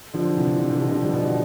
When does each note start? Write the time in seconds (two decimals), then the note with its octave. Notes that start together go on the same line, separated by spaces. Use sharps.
0.14 D3 F3
0.36 C3 E3
0.58 D3 F3
0.71 C3
0.81 B2 D3
0.91 D3 F3
1.03 E3 G3
1.14 B2